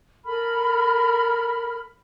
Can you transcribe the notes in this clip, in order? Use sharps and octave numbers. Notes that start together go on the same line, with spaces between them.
A4 A#4 B5 F6